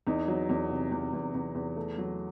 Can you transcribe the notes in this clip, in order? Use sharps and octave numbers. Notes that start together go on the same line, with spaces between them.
E2 D#4
F#3
E2
C3
E2
E2
E2
E2
A3
F#3